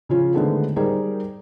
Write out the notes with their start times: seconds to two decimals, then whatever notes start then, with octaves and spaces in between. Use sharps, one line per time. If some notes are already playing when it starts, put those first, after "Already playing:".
0.09 C#3 F3 C#4 F4
0.34 D3 D#3 G#3 A3 B3 C4
0.76 G3 D#4 G#4 A#4 C5